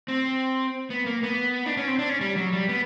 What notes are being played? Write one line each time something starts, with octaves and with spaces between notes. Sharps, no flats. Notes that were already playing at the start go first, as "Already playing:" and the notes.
C4
B3
A#3
B3
D4
C#4
C4
D4
C#4
G3
F#3
G3
B3